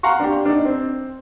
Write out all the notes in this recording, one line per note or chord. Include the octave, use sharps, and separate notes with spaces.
F5 F#5 A#5 C6 C#6
D4 G4
D4 D#4
C4